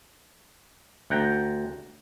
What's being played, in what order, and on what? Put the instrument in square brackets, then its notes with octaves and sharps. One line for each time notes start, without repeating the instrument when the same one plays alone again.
[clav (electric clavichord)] D2 F#5 G5 A#5